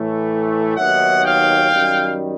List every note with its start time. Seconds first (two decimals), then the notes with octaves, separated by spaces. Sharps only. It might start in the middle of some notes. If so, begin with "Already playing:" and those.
Already playing: A2 E3 A3
0.76 D#2 D#3 F#3 B3 E5 F#5
1.23 F5 G5
1.71 F#2 D#3 G3